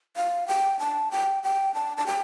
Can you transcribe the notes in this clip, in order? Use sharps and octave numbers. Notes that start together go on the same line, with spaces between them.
F5
G5
A5
G5
G5
A5
A5
G5